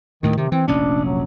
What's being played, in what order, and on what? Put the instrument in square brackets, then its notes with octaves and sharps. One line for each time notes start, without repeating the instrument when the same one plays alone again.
[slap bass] D2 A2 [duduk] D#3
[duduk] C3 [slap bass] D#3
[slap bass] E3 [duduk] C4
[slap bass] F1 A#1 C#4 [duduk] D4
[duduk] F#3